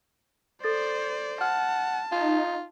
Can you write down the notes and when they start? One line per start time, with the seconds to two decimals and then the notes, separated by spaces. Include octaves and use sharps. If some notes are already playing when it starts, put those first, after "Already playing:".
0.64 A4 C5 D5 A6
1.41 F#5 A5 F6
2.12 D#4 F4